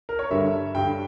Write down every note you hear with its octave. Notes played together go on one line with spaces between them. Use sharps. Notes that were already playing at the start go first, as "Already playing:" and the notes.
A#4
C#5
G2 D3 G3 E5
G2 D3 G3 G5